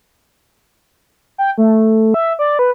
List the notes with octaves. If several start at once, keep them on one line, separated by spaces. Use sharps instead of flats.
G5
A3
E5
D5
B4